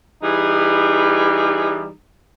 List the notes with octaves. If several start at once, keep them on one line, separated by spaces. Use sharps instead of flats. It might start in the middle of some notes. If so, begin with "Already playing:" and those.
E3 G3 D#4 G#4